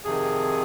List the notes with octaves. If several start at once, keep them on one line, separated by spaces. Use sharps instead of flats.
F2 C3 D#3 G#4